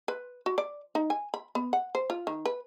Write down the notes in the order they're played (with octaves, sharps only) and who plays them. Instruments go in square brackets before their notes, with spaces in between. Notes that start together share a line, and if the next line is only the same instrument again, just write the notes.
[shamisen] B4
F#4
D5
D#4
G#5
B5
B3
F#5
C5
F4
D#3
B4